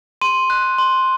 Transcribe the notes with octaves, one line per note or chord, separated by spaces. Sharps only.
C6 D#7
F#6
C6